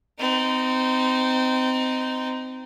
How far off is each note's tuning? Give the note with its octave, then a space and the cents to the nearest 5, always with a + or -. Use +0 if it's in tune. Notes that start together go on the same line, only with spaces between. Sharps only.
C4 -25 D#4 +0